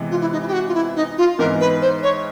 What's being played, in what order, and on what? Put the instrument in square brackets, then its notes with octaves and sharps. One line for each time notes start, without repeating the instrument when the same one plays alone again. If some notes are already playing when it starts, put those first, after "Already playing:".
Already playing: [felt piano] C3 E3 G#3 B3
[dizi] F4
E4
D#4
E4
G4
F#4
F4
E4
D#4
F4
[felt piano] G#2 E3 G#3 B3 D#4 [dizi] A#4
[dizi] B4
C5
C#5